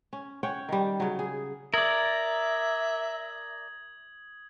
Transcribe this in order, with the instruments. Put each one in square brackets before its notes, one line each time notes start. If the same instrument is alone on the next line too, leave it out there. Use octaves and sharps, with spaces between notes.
[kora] C#4
C#4 C#5 F#5 G5
D#3 G3
C#3 F#3
G#4
[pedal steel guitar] A#4 D5 [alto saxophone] E5 [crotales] D#6 G#6 F#7